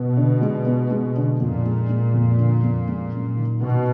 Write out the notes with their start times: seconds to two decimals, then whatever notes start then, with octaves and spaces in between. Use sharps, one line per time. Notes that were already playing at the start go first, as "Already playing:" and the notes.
Already playing: B2 B3
0.17 D3
0.41 G#3
0.66 B3
0.91 G#3
1.16 D3
1.40 F2 A#2
1.65 G#3
1.89 G#3
2.14 F2
2.38 D3
2.63 F2
2.87 G#3
3.12 F#2
3.37 D#3
3.61 B2 B3